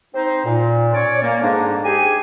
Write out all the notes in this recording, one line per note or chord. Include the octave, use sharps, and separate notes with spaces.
C4 D#4 C5
A#2
C#4 C#5 D5
A#3
G#2 D3 G#3 A#3 D4 D#4
G4 G#4 G#5